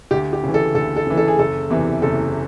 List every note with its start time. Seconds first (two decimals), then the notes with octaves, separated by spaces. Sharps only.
0.11 D2 G4
0.33 G4
0.44 C#3 E3
0.54 A4
0.75 D2 A4
0.96 A4
1.07 C#3 E3
1.17 A4
1.28 G#4
1.39 F#1 A4
1.70 E2 C3 E3
2.02 F#1 A4